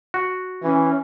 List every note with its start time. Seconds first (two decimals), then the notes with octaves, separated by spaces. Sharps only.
0.14 F#4
0.63 E3 C#4